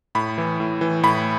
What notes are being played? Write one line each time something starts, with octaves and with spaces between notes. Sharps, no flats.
A2 B5
E3
A2
E3
A2 B5